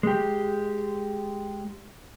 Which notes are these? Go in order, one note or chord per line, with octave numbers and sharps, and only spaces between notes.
G#3 G4